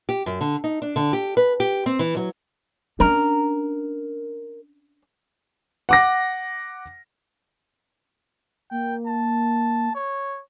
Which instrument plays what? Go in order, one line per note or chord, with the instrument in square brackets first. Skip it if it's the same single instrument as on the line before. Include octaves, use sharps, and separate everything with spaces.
[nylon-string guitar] G4
F#2
D3
D#4
D4
D3
G4
B4
G4
C4
E3
F#3
[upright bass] C#4 D4 [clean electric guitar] A#4
[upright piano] F#5 D6 A#6
[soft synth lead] A#3 [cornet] G5
[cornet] A5
C#5